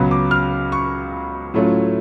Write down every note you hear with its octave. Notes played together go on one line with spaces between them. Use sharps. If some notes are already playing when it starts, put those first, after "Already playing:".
Already playing: C#2 C#3 F#3 B3
D6
F6
C#6
A2 F#3 A3 C#4 F4